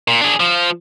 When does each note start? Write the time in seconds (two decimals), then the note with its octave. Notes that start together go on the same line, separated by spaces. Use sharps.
0.08 A#2
0.21 D4 G#4
0.40 F3